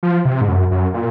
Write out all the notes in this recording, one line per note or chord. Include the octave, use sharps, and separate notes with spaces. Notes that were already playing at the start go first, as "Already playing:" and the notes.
F3
C3
G#2
F#2
F#2
A#2